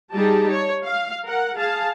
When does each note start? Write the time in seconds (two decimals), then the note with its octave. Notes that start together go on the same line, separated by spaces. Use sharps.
0.13 G3 D#4 G4 G#4 A5
0.50 C#5
0.84 F5
1.24 A#4 F#5
1.58 G#4 F5 A5